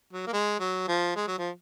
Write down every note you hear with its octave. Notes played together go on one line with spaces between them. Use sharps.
F#3
A#3
G#3
F#3
F3
G#3
F#3
F3